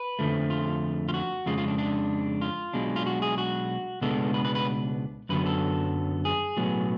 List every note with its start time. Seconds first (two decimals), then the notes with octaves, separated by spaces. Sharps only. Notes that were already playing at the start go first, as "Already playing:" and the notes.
Already playing: B4
0.19 F2 D3 F3 A3
0.50 F4
1.08 F4
1.14 F#4
1.46 F2 C#3 G#3 F4
1.57 F4
1.68 D4
1.78 D4
2.41 F4
2.73 B1 B2 G#3 D4
2.96 F4
3.06 F#4
3.22 G#4
3.38 F#4
4.01 C#2 B2 G#3 B3 D4 A4
4.34 B4
4.45 B4
4.55 B4
5.29 F#2 D3 F#3 B3 B4
5.46 A4
6.25 G#4
6.57 B1 A2 F#3 B3